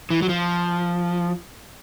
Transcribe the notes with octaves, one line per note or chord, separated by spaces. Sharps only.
E3
F#3
F3